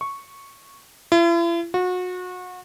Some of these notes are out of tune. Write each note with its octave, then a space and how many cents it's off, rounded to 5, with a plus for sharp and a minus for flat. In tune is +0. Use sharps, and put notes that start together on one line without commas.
C#6 -5
E4 +45
F#4 -30